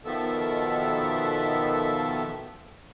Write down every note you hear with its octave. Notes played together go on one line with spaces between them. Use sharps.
B2 D#3 F3 B3 A4 E5